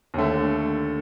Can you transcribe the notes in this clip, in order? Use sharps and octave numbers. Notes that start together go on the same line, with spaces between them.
D#2 D3 A3